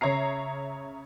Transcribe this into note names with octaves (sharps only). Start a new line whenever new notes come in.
C#3 C#5 E5 A#5 C7